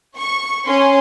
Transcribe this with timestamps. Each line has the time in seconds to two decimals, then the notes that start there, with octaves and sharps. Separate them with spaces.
0.17 C#6
0.67 C#4 C6